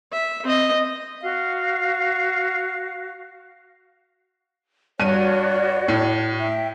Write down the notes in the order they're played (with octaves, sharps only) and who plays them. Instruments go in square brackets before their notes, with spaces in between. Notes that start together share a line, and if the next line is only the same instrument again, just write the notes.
[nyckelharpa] E5
C4 D#5
[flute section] F#4 F5
[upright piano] G2 D#7 [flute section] F#4 C#5 D5
[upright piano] A2
[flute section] E5 G5